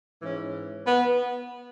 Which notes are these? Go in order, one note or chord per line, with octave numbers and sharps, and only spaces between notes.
G#2 E3 C#4
B3